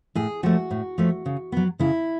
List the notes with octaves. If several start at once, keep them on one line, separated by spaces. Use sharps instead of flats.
A2 G#4
F3 A3 F#4
A2
F3 A3
C#3
F#3 B3
C#3 E4